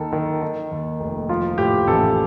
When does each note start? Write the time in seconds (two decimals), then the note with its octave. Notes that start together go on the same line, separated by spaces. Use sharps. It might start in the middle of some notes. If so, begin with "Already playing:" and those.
Already playing: D#2 D#3 A4
0.12 D#3
0.42 D#3
0.71 D#2
1.00 F1
1.29 F3 F4
1.58 A2 G4
1.87 A1 A4